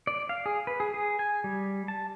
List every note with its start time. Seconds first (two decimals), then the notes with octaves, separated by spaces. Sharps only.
0.07 D5
0.29 F5
0.46 G#4
0.67 B4
0.80 G#4
0.94 G#4
1.19 G#5
1.44 G3
1.88 A5